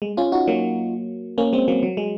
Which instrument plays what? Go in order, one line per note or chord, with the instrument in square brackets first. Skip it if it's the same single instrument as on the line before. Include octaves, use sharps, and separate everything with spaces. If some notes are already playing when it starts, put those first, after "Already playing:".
[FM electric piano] G#3
C#4 F4
D#4 F#4
F#3 A#3
A#3 C#4
G#3 C4
F#3 A#3
F#3
G#3